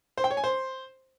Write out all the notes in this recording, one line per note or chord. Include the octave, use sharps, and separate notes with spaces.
C5
G5
C#5
G#5
C5